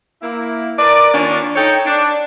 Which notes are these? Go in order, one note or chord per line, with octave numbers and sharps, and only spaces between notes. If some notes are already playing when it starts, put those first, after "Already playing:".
A#3 E4
A#4 B4 D5
D#3 A#3 C#4 D4 F4
D#4 A4 C#5 G5
D4